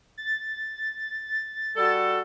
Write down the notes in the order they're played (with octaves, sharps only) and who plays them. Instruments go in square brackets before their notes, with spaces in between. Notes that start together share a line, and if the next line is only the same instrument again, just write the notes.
[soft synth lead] A6
[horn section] G3 F#4 A4